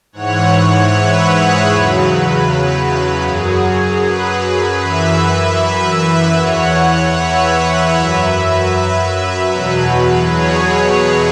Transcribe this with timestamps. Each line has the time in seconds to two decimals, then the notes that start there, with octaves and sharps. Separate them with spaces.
0.13 G#2 E3 C#5 F#5
0.91 B4 E5
1.29 G#4 C#5
1.69 E2 C#3 F#3 B4
3.24 F#2 F#3 G#4
4.03 B4
4.80 F#2 E3 B4 E5
5.58 B4 E5
5.97 B4 E5
6.36 E2 E3 C#5 F#5
7.14 B4 E5
7.92 F#2 F#3 B4 E5
9.48 E2 B2 F#3 B4
10.26 G#4 C#5